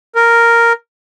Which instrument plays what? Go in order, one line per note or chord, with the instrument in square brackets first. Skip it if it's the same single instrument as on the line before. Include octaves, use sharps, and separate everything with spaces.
[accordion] A#4